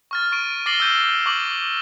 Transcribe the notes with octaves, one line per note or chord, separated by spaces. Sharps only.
C#6 F6 A6
C#6 D7 D#7
D6 A6 A#6 C7 F#7 G7
E6 G6 D#7
C#6 D6 F#7